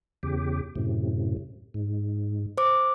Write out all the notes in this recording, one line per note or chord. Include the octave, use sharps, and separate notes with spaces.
E2 C#3 G4
F#2 A2 C3
G#2
C5 D6